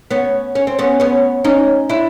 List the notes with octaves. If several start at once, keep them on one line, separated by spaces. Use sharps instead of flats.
B3 C#4
C#4
C4
B3 C#4
B3 C#4
C#4 D#4
D4 E4